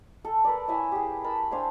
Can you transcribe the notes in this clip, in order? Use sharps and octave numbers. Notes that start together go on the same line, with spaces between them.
A4
A#4 B4 D5
E4 C#5 E5 G#5
G4 G#4
A#4 A5 B5
D4 C5 F5 G#5